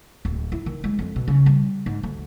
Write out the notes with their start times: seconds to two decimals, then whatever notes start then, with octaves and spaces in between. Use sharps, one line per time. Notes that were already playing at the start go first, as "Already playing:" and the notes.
0.25 D1
0.52 E4
0.66 D#3
0.84 G#3
0.99 F2
1.16 B2
1.28 C#3
1.46 G3
1.86 G#2
2.03 D2